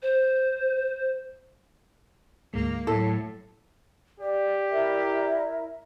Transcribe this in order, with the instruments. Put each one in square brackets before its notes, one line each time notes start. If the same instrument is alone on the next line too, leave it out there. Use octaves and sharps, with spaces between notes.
[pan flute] C5
[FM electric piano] D2 G#2 G#3 [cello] A#3
[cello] A2 F#3 [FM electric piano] E4 [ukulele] A4
[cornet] G4 [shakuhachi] D5
[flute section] E4 A#4 E5